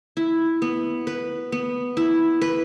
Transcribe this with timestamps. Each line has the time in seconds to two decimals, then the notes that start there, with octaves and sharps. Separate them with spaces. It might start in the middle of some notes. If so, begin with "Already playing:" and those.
0.17 E4
0.62 B3
1.07 B4
1.52 B3
1.97 E4
2.41 B4